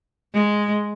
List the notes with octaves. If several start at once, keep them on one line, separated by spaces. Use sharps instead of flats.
G#3